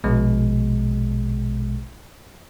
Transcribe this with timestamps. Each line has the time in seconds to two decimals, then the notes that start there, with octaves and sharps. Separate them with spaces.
0.04 A#1 B2 G#3